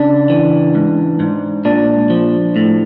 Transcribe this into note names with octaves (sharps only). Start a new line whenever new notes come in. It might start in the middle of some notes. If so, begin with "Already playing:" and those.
Already playing: C#3 D4
E3
G#2
G#2
A#2 D4
F3
A2